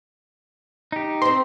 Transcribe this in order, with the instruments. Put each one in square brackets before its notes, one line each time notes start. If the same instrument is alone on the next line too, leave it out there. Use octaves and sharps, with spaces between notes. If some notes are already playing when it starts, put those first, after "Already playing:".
[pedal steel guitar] D#4 G4
[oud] C4 C5 [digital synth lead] C6